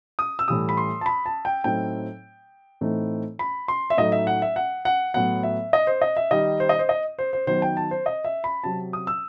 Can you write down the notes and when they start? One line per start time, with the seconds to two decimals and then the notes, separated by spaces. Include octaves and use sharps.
0.19 D#6
0.39 E6
0.48 A2 E3 G3 D#6
0.69 B5
0.77 C6
1.01 A5
1.06 B5
1.26 A5
1.45 G5
1.64 A2 F#3 A3 C4 D#4 G5
2.81 A2 E3 A3 C4 D#4
3.39 B5
3.68 C6
3.90 E5
3.97 A2 F#3 A3 D#4 D#5
4.12 E5
4.27 F#5
4.42 E5
4.56 F#5
4.85 F#5
5.14 A2 F#3 B3 F#5
5.43 E5
5.73 D#5
5.87 C5
6.02 D#5
6.17 E5
6.31 D#3 G3 D#4 D#5
6.60 C5
6.69 D#5
6.79 C5
6.89 D#5
7.19 C5
7.33 C5
7.47 D#3 F#3 B3 D#4 C5
7.62 G5
7.77 A5
7.91 C5
8.06 D#5
8.25 E5
8.44 B5
8.64 C3 F#3 C4 A5
8.93 D#6
9.07 E6